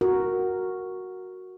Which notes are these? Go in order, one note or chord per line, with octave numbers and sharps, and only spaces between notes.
F#4 A#4